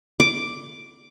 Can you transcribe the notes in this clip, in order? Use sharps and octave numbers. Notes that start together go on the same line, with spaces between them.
D6